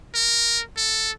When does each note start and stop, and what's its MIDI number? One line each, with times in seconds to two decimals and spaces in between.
0.15 0.62 70
0.77 1.11 69